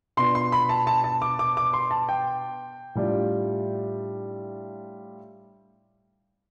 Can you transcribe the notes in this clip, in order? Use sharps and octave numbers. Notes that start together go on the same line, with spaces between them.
B2 B3 D4 F4 C6
C6
B5
A5
A5
A5
D6
D6
D6
C6
A5
G5
A2 G3 D4 F4